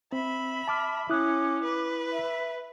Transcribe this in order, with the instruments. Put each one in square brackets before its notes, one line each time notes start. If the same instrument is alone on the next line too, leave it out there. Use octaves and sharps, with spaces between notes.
[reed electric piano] C4 [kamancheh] E5 B5
[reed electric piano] A5 D6 F6
[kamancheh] C#4 [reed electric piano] E4 D#6 F#6 [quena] D6
[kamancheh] B4
[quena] E5